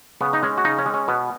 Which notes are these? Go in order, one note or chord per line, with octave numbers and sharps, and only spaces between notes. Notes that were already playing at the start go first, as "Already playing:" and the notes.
C#3 B3
D#4
G#3 C#4
F#4
C#3 D#4
C#4
G#3
C#4
B2 B3